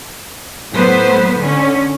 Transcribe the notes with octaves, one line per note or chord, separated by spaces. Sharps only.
A2 F#3 B3 B4 C5
D3 C#4